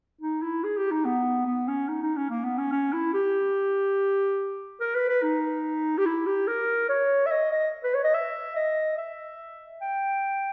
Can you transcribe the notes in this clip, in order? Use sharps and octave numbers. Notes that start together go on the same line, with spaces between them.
D#4
E4
G#4
G4
D#4
B3
B3
C#4
D#4
D#4
C#4
A#3
B3
C#4
C#4
E4
G4
A#4
B4
B4
D#4
G4
E4
G4
A#4
C#5
E5
D#5
D#5
B4
C#5
D#5
E5
D#5
E5
G5